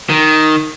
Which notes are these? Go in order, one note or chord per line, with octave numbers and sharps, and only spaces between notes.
D#3